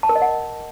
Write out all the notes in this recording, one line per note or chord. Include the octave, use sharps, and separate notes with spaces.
A5
A#4
D#5
F#5